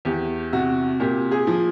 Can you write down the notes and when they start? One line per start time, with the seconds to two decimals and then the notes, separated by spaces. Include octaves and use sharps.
0.05 E2 G4
0.53 C3 F#4
1.00 A#2 G4
1.31 G#4
1.47 F3